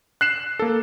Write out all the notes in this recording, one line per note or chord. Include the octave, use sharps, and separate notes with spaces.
F#6 C7 E7
A#3 A4